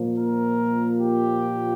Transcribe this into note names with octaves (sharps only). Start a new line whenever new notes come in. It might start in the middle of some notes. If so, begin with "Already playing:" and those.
Already playing: A#2 F3 A#3
A#4
G4